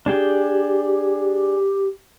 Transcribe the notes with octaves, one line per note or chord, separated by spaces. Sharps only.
D4 G4 G#4 G5
G4